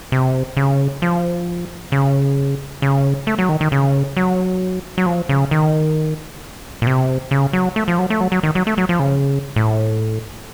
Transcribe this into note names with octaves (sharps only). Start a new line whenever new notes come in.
C3
C#3
F3
C#3
C#3
A3
F#3
D#3
D#3
C#3
F#3
F#3
F3
C#3
D#3
A#2
C3
C#3
F#3
A3
F3
F#3
A3
F#3
F#3
D#3
F#3
A3
F#3
F3
C#3
A2